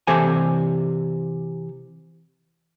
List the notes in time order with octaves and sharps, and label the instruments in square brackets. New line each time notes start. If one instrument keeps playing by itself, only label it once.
[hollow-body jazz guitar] C3 E3 G4 A4 C5 G#5